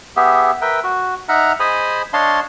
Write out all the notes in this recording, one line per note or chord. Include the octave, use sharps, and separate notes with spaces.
B3 G4 G#4 E5
A#4 B4 E5 G5
F#4
D#4 E5 F#5 A#5 F6
G#4 C5 D#5 G#5 B5 D#6
D4 C#5 D#5 F5 A5 C6